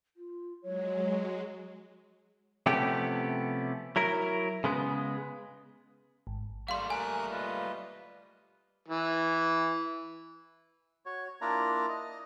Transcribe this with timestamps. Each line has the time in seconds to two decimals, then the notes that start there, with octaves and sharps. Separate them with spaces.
0.16 F4
0.62 F#3 G#3 C#5
2.66 C3 F3 A3 B3 C#4 G4
3.96 F#3 E4 A#4
4.64 C#3 G#3 B3
6.27 G#1
6.68 G3 A3 A#3 F5 C6
6.90 A#4 G#5 D#6 F#6
7.32 F4 B4 D#5
8.88 E3
11.06 F#4 C#5
11.41 A#3 D4 E4 F4 D5 A#5
11.88 D#5